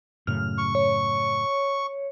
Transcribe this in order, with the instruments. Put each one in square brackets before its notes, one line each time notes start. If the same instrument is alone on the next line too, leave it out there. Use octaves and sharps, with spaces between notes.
[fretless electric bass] F#2 A2 C#3 [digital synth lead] F6
[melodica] C#6
[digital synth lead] C#5